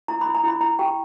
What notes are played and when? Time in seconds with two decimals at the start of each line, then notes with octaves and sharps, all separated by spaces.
0.08 E4 A#5
0.21 E4 B5
0.35 A#5
0.44 E4 B5
0.61 E4 A#5
0.79 G4 G5